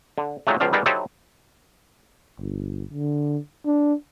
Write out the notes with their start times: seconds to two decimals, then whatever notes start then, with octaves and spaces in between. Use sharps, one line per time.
0.18 D3
0.47 A#2 D#3 F#3 G#3 A3
0.60 C#2 B2 F3 D5 F5
0.73 G3 B3 D#4 G#4 A#4 D5
0.86 F#3 D#4 E4 G4 A4 C5
2.38 G1
2.93 D3
3.66 D4